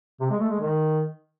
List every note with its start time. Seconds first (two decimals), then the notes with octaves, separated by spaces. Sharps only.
0.20 C3
0.30 G#3
0.40 A3
0.50 G#3
0.60 D#3